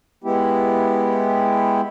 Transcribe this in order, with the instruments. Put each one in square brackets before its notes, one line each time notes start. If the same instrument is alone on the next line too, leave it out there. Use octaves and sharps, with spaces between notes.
[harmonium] G#3 B3 E4 G4